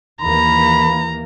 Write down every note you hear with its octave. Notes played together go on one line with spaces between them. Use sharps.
D#2 E3 A#3 A#5 B5